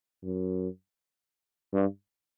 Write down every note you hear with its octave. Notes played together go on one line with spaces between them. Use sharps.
F#2
G2